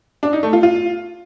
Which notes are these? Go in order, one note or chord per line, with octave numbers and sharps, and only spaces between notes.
D4
D#4
A3
F4
F4